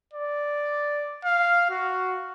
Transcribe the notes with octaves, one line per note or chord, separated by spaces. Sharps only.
D5
F5
F#4